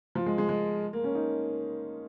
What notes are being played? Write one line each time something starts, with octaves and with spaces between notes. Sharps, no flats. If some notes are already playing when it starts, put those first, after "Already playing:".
F3
G#3
G#3
G#3
A#3
C#4
D#4